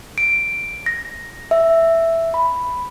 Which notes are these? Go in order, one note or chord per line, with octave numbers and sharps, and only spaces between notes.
D7
A#6
E5
B5